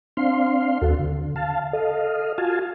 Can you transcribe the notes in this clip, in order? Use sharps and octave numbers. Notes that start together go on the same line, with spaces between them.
C4 D4 F5 C6
D#2 F#4 A4
D3
F5 A5
A4 D#5 F5
F4 F#4 F5 G#5 A5